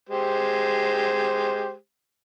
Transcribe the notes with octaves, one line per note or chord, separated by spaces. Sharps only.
G#3 G4 C5